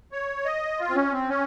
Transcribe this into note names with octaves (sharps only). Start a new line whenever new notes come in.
C#5
D#5
F4
C4
C#4
C4
C#4